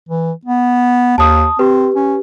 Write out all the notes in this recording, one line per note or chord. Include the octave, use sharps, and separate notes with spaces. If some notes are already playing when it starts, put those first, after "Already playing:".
E3
B3
D#2 A5 D#6
C4 G4 B4
C#4